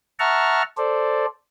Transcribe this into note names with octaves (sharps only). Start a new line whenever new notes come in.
E5 F#5 A5 A#5 C#6 F6
A4 C5 D5